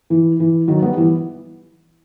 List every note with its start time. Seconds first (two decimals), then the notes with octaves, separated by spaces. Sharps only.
0.10 E3
0.40 E3
0.68 D#3 F#3
0.82 G3 B3
0.97 E3